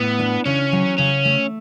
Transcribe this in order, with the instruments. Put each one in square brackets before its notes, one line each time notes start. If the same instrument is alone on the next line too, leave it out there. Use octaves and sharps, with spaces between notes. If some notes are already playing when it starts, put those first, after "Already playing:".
Already playing: [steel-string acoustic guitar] A2 [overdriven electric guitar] B3
[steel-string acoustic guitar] D4
[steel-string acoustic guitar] C#3 [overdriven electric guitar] C#4
[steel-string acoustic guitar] F#3
[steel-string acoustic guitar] C#3 [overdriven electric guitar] C#4
[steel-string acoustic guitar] A3